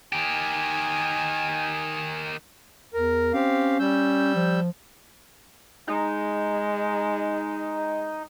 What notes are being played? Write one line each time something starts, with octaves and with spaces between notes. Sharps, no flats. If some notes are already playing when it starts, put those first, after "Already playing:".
D#3 G4 G#5
E2 A#4
C4 C#4 G4 F5
G3 E6 G6
F3
G#3 D#4